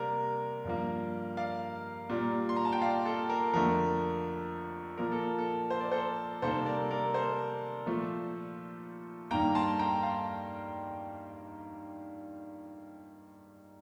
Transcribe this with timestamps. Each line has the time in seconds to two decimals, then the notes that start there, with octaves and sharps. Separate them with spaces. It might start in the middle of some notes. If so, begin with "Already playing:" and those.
Already playing: C3 G3 A#3 A#4 D5
0.64 G2 F3 A#3
1.37 D5 F5
2.09 A#2 G3 A#3
2.49 C6
2.56 A#5
2.65 A5
2.73 G5
2.81 D5 F5
3.06 A4
3.29 A#4
3.53 F2 D3 F3 A3 A#4
4.98 A#2 F3 A#3 A#4
5.12 A4
5.38 A4
5.70 C5
5.81 D5
5.91 A4 C5
6.42 C3 D#3 G3 A#3 A4 C5
6.66 A#4 D5
6.91 A#4 D5
7.14 A4 C5
7.86 A#2 F3 A3
9.31 G2 D#3 A#3 G5 A#5
9.55 A5 C6
9.79 G5 A#5
10.03 F5 A5